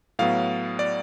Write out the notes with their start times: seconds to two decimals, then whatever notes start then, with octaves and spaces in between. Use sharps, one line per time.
0.19 A2 F#3 B3 F5
0.79 D5